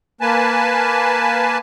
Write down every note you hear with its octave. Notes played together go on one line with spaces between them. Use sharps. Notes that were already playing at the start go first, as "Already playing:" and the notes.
A#3 B4 G#5 A5